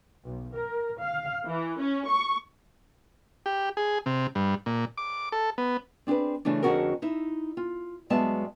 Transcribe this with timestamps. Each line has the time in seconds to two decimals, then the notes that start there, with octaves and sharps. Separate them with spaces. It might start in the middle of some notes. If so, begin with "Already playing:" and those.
0.24 B1
0.55 A#4
1.01 F5
1.45 E3
1.79 C#4
2.08 C#6
3.46 G4
3.77 G#4
4.06 C3
4.35 G2
4.66 A#2
4.98 D6
5.32 A4
5.58 B3
6.07 C4 D4 G4 G#4 B4
6.45 C#3 E3 A3 D4
6.63 F2 D3 C#4 F#4 G#4 A#4
7.02 D#4 E4 E5
7.57 F4
8.10 G2 F#3 G#3 B3 E5 A5